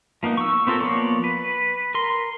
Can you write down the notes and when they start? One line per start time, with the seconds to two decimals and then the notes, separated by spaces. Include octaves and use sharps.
0.23 F3 A#3 B3 D#4
0.37 C#6 E6
0.67 B3 C4 F4 A4 A#4
0.80 F3 A#3 B3 C#5 D5
1.24 B4
1.95 A#4 C6